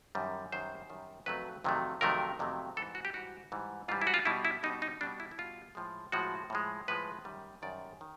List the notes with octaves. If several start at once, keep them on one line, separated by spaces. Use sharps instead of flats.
F#2 D#3 G3
F#2 D#3 G3 C5
F#2 D#3 G3
F2 C3 D#3 F#3 A3 B4
F2 C3 D#3 F#3 A3
F2 C3 D#3 F#3 A3 A#4
F2 C3 D#3 F#3 A3
G#2 E3 G3 A4
F#4
G4
G#2 E3 G3 F#4
G#2 E3 G3
G#2 E3 G3 F4
E4
F#4
F4
B2 G3 E4
E4
B2 G3 D#4
D#4
B2 G3 D4
E4
E4
B2 G3 F4
A2 F3 G#3
A2 F3 G#3 F#4
A2 F3 G#3
A2 F3 G#3 B4
F#2 D#3 G3
F#2 D#3 G3 D5
D#3